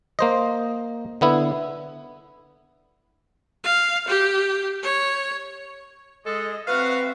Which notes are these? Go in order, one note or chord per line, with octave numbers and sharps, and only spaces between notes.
A#3 C5 D#5
D3 B3 E4
F5
G4
C#5
G#3 A4 D#5
C4 F#4 B4 E5 F5